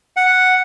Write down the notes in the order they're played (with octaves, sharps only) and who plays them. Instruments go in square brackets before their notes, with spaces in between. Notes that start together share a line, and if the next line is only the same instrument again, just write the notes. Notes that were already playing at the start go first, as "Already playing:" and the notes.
[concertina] F#5